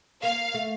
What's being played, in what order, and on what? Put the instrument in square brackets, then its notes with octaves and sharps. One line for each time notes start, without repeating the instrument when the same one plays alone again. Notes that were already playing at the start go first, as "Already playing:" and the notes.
[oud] A#3 [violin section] F5
[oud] A3